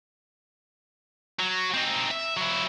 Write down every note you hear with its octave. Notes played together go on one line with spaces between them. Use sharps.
F#3
C4 D#4
E5
F#3 E4